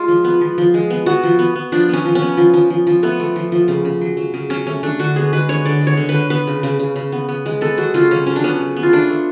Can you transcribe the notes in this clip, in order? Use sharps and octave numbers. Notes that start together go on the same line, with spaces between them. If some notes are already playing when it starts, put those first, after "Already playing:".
Already playing: G#3 F4
F3
B3
F3
F3
G#3
B3
B3 F#4
F3
B3
B3
F3 D4
B3 C#4
F3
C#4
B3
F3
F3
F3
F3
A3 B3
A3
F3
F3
C#3
C#3
F#3
F#3
C#3
F#3 C#4
A3 C#4
A3 D4
D3 F#4
B3 G#4
G#3 B4
D3 C#5
D3 D5
G#3
C#5
D3
D3 B4
B3 B4
C#3
C#3
C#3
C#3
B3
B3
G#3
B3 A4
F#3 F#4
C#3 F4
C#3 C#4
F#3 C#4
D4
B3 C#4
C#3
B3
F4
A3 D4
A3